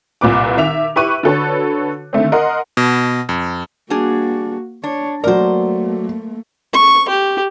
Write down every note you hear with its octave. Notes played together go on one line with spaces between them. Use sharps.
C2 A#2 B4 D6
D#3 E5 F7
E4 G4 B4 C#6 F#6 D#7
D3 F#4 A4 B4 C#5
D3 D#3 A3 C4
A#4 D#5 F#5 C6
B2
F2
G3 A#3 D4 F#4 G#4
D4 C#5
F#3 A3 A#3 A#4 C5 D5
C#6
G4